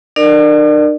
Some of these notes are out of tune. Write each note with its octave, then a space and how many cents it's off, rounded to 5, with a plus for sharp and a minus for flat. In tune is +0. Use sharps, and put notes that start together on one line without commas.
D4 +45 A#4 -5 D5 +30